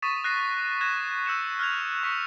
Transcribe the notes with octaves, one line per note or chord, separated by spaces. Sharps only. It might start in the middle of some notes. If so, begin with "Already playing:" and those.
C#6 D#6 A6 B6 D#7 E7
F#6 A#6 C7 D#7
F#6 G#6 A#6 E7
E6 G6 C#7 E7
F6 F#6 G#6 F7
C#6 B6 C#7